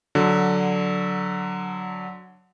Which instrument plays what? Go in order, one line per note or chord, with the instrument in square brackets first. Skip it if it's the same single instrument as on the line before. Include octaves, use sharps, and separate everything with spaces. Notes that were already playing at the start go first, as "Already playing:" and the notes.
[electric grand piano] D3 F#3